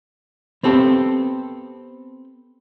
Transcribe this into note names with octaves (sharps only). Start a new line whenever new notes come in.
B3 C4 G4 A4